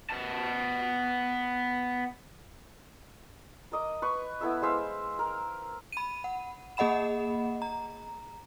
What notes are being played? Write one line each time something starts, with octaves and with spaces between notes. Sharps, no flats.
B3 A5
A#4 D#5 D6
B4 C#6
B3 E4 A4 E5
G#3 C5 E5 F5
A#4
B5 D#7
F#5
A#3 G#4 D#5 F#5 B5 E7
A#5